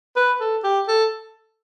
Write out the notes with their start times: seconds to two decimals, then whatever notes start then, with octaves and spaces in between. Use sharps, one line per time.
0.16 B4
0.40 A4
0.64 G4
0.88 A4